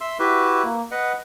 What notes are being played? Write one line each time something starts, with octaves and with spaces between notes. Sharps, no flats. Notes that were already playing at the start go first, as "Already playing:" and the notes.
E5 C6 E6
E4 F#4 G4 B4 E5
A#3
B4 D#5 F#5